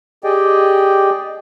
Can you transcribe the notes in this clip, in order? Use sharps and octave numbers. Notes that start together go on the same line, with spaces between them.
G4 G#4 D5 D#5 G5